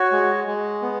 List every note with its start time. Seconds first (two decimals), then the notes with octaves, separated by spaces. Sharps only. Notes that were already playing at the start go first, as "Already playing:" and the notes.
Already playing: F#4 C#5
0.12 G#3
0.47 G#3
0.82 B3